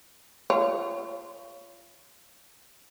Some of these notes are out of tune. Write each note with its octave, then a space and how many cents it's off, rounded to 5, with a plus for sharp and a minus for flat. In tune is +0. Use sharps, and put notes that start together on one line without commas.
F4 -30 C#5 +20